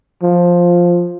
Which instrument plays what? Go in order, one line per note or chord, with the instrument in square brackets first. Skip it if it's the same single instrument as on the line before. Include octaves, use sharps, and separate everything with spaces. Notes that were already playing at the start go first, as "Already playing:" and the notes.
[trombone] F3